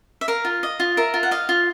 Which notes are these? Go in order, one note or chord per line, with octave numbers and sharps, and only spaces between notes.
E5
A#4 F5
F4
D#5
F4
A#4 E5
F4
F#5
D#5 F5
F4